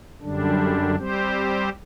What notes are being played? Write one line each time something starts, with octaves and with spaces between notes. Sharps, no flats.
F#2 D3 G3 D4
G3 C4 G4 C5